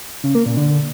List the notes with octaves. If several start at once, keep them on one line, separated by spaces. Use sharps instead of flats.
C#3
A#3
A#2
D3